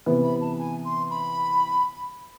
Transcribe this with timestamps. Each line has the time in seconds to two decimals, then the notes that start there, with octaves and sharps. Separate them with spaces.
0.06 C3 E3 B3
0.23 B5
0.41 A5
0.58 G#5
0.84 C6
1.10 B5